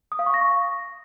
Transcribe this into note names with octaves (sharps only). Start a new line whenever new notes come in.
D#6
F5
C#6
A#6
C#6